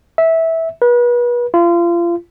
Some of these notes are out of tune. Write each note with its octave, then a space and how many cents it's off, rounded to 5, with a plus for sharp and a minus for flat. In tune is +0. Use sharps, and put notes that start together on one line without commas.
E5 -15
B4 -35
F4 -30